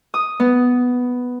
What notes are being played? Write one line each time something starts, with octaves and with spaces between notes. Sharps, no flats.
D#6
B3